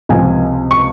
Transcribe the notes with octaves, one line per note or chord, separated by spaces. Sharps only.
C#2 C3 F3 G#5
C#6